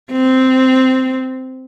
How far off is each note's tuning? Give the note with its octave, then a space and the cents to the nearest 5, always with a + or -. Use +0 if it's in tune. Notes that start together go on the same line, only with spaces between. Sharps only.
C4 -10